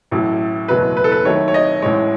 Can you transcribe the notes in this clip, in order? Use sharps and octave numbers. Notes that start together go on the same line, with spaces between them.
A1 A2 F#3 A3
F#1 E2 B2 F#3 A3 B4
B4
A4
B4
D#2 D#3 F#3 A3 C#5
C#5
D#5
A1 A2 G#3 C#5